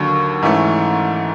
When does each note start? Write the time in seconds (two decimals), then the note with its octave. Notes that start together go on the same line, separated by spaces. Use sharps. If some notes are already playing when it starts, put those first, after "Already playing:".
Already playing: D#2 D3 F#3 C#6
0.42 G#2 E3 A3 C#4